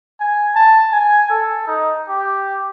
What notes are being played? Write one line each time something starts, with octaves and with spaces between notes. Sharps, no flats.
G#5
A5
G#5
A4
D#4
G4